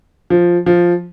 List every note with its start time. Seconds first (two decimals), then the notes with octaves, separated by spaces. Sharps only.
0.30 F3
0.66 F3